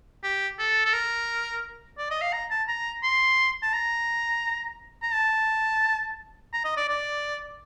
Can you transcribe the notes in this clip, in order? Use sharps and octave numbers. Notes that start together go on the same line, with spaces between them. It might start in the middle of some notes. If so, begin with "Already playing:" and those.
G4
A4
A4
A#4
D5
D#5
F5
A#5
A5
A#5
C6
A5
A#5
A#5
A5
A#5
D#5
D5
D5